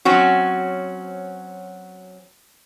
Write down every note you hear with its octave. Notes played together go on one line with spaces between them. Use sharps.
F#3 C4 C#4 F#4